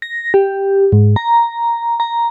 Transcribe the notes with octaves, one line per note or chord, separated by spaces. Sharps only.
A#6
G4
G#2
A#5
A#5